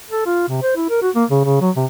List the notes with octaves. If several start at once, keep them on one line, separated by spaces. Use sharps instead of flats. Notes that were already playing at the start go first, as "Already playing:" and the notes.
A4
F4
C3
C5
E4
A#4
F#4
A#3
C#3
C#3
F#3
C3